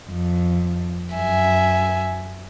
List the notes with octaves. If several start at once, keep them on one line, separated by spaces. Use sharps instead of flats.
F2
F#2 E5 G#5